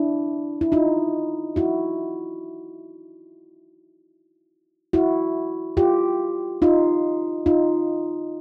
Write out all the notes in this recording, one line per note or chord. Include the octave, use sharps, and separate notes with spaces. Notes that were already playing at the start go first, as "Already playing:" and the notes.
Already playing: D4 E4
E4
D#4 F4
E4 F#4
E4 F#4
F4 G4
D#4 F4
D#4 F4